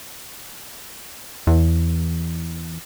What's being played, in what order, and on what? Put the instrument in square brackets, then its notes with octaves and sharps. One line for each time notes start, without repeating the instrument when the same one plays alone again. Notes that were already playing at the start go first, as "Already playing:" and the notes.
[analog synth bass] E2